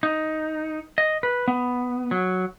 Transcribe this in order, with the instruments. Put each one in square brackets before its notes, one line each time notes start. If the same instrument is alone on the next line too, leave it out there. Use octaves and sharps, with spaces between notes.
[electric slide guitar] D#4
D#5
B4
B3
F#3